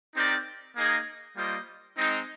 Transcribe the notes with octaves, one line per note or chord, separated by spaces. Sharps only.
C4 D#4 G4 A#4 D5
A#3 D#4 G#4 D#5
G3 A#3 F4 C5 D#5
G#3 C4 D#4